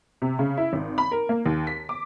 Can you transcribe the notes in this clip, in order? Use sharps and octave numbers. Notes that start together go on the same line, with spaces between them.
C3
C#3
E4
G#1
B5
A#4
A#3
D#2
B6
D6